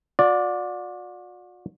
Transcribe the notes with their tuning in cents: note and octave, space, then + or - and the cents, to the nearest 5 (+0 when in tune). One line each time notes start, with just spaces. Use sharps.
F#4 -45 D5 +0